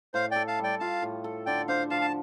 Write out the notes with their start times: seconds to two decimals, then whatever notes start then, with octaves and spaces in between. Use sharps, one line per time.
0.14 A2 C5 F5
0.31 A4 D5 G5
0.47 F5 A5
0.59 G3 D5 G5
0.80 F4 F5 A5
1.02 A2
1.24 A4
1.46 D3 D5 G5
1.68 D4 C5 F5
1.90 F3 F5 A5
2.02 A5